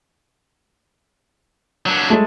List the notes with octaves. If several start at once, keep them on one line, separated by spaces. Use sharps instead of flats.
F#3 D4
G#3 A3